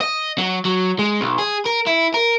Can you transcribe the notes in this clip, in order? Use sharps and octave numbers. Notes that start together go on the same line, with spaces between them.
D#5
F#3
F#3
G#3
B1
G#4
A#4
E4
A#4